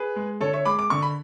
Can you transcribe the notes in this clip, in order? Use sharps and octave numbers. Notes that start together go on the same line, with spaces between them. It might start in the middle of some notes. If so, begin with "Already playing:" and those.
Already playing: G#4 B4
G#3
D3 A4 C#5
C#5 E5
G#3 B5 D6
D6
D3 C#6
B5